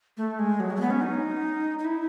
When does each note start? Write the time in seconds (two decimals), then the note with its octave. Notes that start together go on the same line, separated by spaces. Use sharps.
0.17 A3
0.39 G#3
0.60 F#3
0.70 G#3
0.76 A3
0.80 B3
0.90 C#4
1.02 D#4
1.79 D#4
1.85 E4